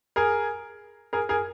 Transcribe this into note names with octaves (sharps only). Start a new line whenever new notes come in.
G#4 A#4
G#4 A#4
G#4 A#4